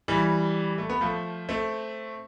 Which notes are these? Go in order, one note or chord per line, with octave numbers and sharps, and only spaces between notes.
E3 G3
A3
B3
F3 A3
A3 C4